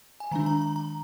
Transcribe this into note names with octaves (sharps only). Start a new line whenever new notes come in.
G#5
D#3 G#3 D4 A#5
A#5
A#5
A#5